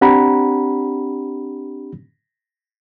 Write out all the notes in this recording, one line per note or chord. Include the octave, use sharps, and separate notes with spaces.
C4 D4 G4 F#5 A#5 B5